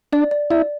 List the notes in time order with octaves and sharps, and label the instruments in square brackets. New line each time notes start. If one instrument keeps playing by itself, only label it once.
[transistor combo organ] D4 [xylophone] D5
[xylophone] D5
[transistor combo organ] E4 [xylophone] D5